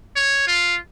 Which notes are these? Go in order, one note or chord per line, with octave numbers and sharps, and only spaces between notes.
C#5
F4